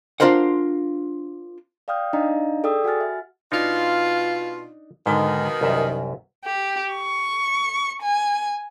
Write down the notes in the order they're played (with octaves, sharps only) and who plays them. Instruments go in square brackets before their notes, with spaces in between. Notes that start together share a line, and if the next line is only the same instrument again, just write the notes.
[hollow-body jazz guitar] D4 F4 A#4 C5 F#5
[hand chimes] D5 F5 G5 D#6 F6 G6
D4 D#4 D5 D#5 F5 A#5
G#4 A4 D5 G5 D#6 E6
F#4 F#5 G#5 F6 A6
E5
[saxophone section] B2 F4 [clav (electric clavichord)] D4 D#4
[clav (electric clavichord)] G#2 D3 [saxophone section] B2 D#3
[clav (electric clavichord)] C2 F#2 E5
[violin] G4
C#6
G#5